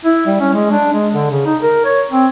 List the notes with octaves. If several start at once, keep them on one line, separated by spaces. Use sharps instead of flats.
E4
G3
C#4
G#3
D4
G#3
D3
C#3
D#4
A#4
C#5
C4